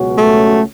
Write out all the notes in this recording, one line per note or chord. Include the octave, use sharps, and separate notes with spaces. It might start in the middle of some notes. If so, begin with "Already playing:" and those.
Already playing: C#2 B2 F#3 C#4 F#4
A3